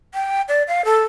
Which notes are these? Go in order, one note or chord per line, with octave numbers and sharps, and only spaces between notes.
G5
D5
F5
A4